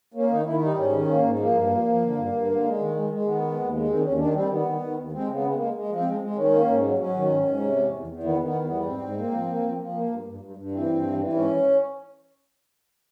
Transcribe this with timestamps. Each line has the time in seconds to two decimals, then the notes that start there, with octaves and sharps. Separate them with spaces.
0.14 A#3 C#4
0.30 D#3 D#4
0.45 D#3 E4
0.62 G3 D#4
0.77 G#2 C#4
0.92 D#3
1.07 A#3
1.23 G#2
1.39 F3 A#3
1.54 G2
1.69 F3
1.85 F3
2.01 D3
2.16 G2
2.32 G2
2.48 D3
2.63 G#3
2.78 D#3
2.95 G#3
3.10 G#3
3.25 D#3 B3
3.41 G#3
3.56 D#2
3.72 G#3
3.88 D#3 C4
3.98 D4
4.03 D#2 C#4
4.18 D#3 D4
4.34 G3 C4
4.49 D#3 B3
4.65 D#3
4.80 D#3
4.97 D#2
5.12 G#3 C4
5.27 C#3
5.33 B3
5.44 G#3
5.54 G#3 A#3
5.74 G#3
5.89 F3
5.95 C4
6.05 G#3
6.21 G#3
6.36 D#3 C#4
6.51 A#3
6.68 G#2
6.83 F#3
6.98 F#3 C#4
7.14 D#3
7.29 G#2
7.45 G#2
7.60 C3
7.76 E2
7.91 E2
8.07 E2
8.23 D#3 B3
8.38 D#3
8.43 B3
8.54 E2
8.64 B3
8.69 G3
8.84 G#2 C4
9.00 G#2
9.17 A#3
9.31 F3
9.47 A#3
9.62 F3
9.78 F3
9.93 A#3
10.09 G2
10.24 G2
10.40 G2
10.56 G2
10.71 E3 C4
10.87 G2
11.02 E3
11.18 E3
11.33 G#2 C#4